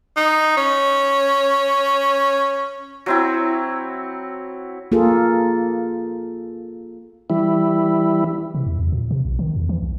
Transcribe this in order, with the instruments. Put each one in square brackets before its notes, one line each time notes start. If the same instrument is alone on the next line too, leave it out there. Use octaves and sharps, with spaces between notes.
[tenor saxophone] D#4
C#4
[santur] F#3 C4 E4
[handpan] A#3 F4 G#4 A4
[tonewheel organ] E3 G3 E4
[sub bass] C3
E2
E2
A#2
C3
B1
D#3
E2
E3
C2